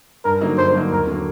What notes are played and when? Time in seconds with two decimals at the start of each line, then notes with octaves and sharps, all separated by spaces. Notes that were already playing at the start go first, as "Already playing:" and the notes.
0.24 G2 A#4
0.41 D3 F#3 A#3 D#4
0.58 G2 C5
0.74 D3 F#3 A#3 D#4
0.91 D#2 A#4
1.07 D3 F#3 A#3